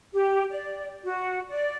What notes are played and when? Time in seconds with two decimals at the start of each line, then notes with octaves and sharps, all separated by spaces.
0.14 G4
0.51 D5
1.04 F#4
1.50 D5